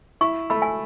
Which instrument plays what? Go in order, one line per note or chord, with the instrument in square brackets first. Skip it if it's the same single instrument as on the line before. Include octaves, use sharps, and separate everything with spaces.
[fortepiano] E4 [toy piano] C#6
[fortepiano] A3 [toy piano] B5
[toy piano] G#5